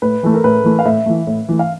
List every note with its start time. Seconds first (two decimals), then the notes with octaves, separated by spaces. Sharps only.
0.02 A2 B4
0.23 E3 A3 A4
0.34 A#4
0.44 A2 B4
0.64 E3 A3
0.79 F5
0.85 A2 E5
1.06 E3 A3
1.27 A2
1.49 E3 A3
1.59 F5